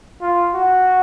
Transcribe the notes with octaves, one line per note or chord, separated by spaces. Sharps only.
F4
F#4